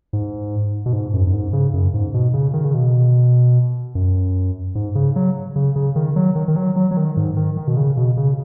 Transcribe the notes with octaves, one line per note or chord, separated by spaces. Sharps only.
G#2
B2
G#2
F#2
F#2
G#2
C#3
F#2
G#2
B2
C#3
D#3
C#3
B2
F#2
G#2
C#3
F#3
C#3
C#3
D#3
F#3
D#3
D#3
F#3
F#3
F#3
D#3
G#2
D#3
D#3
B2
C#3
B2
C#3